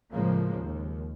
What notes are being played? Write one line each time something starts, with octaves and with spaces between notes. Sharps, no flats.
A2 C#3 F3 G#3 A#3
D#2